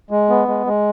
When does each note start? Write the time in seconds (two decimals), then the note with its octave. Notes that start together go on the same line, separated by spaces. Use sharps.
0.11 G#3
0.29 B3
0.48 G#3
0.66 G#3